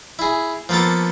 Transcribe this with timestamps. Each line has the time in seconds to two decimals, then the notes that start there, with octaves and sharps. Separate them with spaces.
0.19 E4 G#4
0.69 F3 A#3 B3 A4 D6